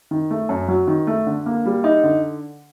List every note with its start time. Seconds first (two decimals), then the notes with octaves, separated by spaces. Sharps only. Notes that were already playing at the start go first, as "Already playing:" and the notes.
0.11 D#3
0.31 A3
0.49 F#2
0.68 F#3
0.87 D#3
1.07 A3
1.26 D3
1.46 A#3
1.65 G3
1.84 D#4
2.03 D3